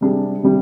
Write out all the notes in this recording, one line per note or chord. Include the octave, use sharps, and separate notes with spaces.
C3 G3 D4 G#4
C3 G3 D4